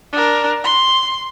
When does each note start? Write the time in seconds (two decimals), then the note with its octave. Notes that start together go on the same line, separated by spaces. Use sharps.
0.13 D4 A#4
0.64 C6